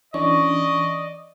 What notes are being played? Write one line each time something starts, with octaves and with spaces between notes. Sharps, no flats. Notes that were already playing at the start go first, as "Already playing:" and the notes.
E3 C#4 D4 D5 D#5 C#6